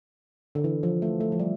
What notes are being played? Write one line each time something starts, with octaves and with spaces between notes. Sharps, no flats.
D3
E3
F3
A3
A3
F3
G3